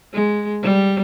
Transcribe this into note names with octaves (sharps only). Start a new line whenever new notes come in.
G#3
G3